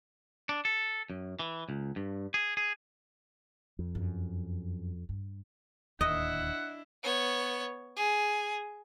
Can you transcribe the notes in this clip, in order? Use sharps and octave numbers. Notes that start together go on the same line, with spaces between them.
D4
A4
F#2
E3
C#2
G2
G#4
G#4
F2
F#2
G2
D1 D#2 D4 E4 D#5 F#5
B3 C#5
G#4